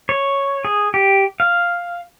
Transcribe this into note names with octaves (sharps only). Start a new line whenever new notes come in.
C#5
G#4
G4
F5